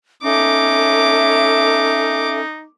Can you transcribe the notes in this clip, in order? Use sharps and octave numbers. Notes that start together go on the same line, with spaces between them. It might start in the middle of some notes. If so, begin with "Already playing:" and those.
C#4 D#4 A4 E5 D6